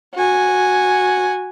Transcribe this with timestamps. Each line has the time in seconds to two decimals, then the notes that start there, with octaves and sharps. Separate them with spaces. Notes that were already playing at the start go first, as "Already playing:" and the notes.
0.14 F#4 G#5